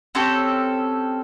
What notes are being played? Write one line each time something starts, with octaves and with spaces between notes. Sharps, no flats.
C4 C#4 G4 A4